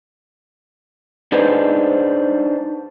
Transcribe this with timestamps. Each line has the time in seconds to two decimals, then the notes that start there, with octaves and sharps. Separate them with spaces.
1.32 D4 D#4 G#4 B4 C5